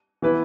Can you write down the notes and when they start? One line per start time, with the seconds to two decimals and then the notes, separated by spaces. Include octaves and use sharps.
0.22 E3 B3 E4 B4